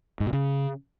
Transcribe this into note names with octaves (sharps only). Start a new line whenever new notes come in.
G#2
B2
C#3